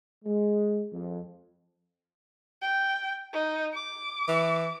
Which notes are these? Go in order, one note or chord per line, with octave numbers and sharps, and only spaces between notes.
G#3
F2
G5
D#4
D6
E3